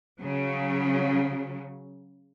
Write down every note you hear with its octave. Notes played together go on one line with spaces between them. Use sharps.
C#3 F#3